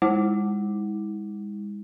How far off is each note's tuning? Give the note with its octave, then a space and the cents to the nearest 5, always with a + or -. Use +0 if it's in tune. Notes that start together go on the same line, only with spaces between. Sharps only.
G#3 -30 E4 -40